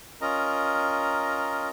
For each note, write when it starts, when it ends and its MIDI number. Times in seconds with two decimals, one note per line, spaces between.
0.22 1.69 61
0.22 1.69 65
0.22 1.69 70
0.22 1.69 75
0.22 1.69 82